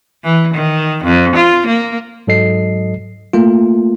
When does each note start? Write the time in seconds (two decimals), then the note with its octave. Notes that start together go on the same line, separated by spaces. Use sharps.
0.24 E3
0.54 D#3
1.04 F2
1.36 F4
1.67 A#3
2.27 G#2 F#3 A4 D#5 C7
3.33 A3 A#3 F4